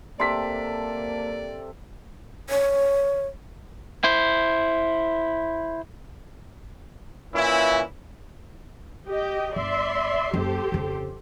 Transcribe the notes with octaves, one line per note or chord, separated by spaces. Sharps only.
C3 A#3 A4 D5 C6 D6 B6
C#5
E4 C5
A#2 E3 C#4 E4
G4 D#5 G5
G1 D5 E5 C6
F#1 G4 A4 C5
F2 C#3